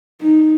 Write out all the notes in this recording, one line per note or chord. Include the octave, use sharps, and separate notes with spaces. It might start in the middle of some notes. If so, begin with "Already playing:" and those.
D#4